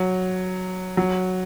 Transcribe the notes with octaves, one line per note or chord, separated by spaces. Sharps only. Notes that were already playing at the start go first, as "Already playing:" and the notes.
Already playing: F#3
F#3